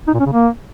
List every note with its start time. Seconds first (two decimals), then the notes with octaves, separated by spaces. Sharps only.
0.07 D#4
0.14 A#2
0.20 C#4
0.26 C#3
0.32 A#3